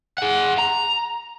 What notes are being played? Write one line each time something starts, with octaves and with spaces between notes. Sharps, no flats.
G#4 F#5
A#5